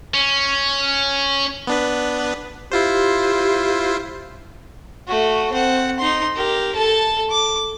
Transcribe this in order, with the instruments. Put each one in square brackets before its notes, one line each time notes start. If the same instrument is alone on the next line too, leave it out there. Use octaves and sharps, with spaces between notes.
[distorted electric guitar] C#4
[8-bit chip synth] B3 D4 B4
[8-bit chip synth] E4 F4 C5 [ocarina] G4
[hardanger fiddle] A3 F#4
C4 F#5
D#4 C6
G4 A#4
A4 A5
D6